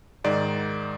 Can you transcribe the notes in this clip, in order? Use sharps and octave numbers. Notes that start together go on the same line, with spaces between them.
G#2 D#3 D5